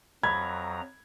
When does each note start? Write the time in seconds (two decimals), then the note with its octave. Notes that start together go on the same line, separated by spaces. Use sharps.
0.23 F2 F#3 A#5 B5 G#6